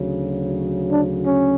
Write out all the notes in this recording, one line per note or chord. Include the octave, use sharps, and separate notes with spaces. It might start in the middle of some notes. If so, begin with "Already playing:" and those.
Already playing: D2 C#3 F#3
D4
C#4